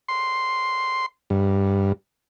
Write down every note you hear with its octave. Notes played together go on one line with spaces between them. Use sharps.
C6
G2